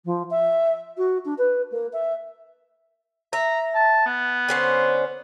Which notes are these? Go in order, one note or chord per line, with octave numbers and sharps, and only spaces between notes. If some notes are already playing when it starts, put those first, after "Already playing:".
F3
E5
F#4
D4
B4
A#3
E5
E5 A#5
A5
B3
D3 C#4 C5